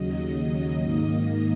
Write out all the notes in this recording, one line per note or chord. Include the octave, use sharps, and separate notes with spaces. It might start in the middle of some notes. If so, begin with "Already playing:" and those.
Already playing: D#2 C#3 F#3 D#5
G#2 D#3 A#3